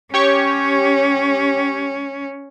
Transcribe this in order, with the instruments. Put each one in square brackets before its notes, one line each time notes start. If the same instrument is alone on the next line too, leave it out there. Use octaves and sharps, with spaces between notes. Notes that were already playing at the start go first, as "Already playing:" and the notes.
[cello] C#4 [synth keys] G4 C#5 C#6